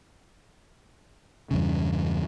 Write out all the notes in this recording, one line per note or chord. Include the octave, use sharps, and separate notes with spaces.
E2 G2 C#3